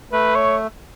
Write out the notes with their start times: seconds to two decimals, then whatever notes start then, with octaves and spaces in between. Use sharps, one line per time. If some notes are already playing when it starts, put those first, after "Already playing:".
0.12 A3 B4
0.35 C#5